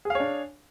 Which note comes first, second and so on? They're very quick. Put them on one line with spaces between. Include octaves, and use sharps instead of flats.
G#4 F5 C#5 D4